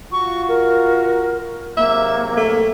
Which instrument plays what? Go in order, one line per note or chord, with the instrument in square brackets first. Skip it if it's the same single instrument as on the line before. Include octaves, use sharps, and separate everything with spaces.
[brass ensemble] F4 F#4 [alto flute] C#6
[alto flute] A#4
[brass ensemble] G#2 C3 F#3 [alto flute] A#3 [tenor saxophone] E5
[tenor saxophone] A3